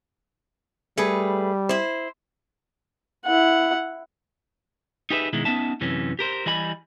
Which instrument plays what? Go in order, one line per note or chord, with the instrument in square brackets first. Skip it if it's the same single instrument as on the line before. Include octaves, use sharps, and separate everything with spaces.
[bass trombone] G3 [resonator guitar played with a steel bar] A3 G#4 B4
[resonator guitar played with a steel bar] E4 C5
[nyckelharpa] E4 F#5
[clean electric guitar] D#4 G4 G#4 B4 C5 E5
B2 D#3 G#3 E4
B3 C#4 D#4 E5 A5
F#2 C3 E3 C#4
G4 A#4 C5
E3 G3 D#5 G#5 B5